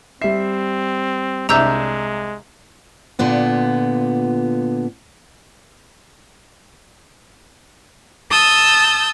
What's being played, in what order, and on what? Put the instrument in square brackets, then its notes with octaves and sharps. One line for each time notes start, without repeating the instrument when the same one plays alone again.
[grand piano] G3 C7 [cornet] C4 [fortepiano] E5
[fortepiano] C2 D4 E5 [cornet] G#3 [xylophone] A#5 E6 G6
[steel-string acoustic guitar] A#2 D3 B3 F4
[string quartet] A5 D#6 E6 G6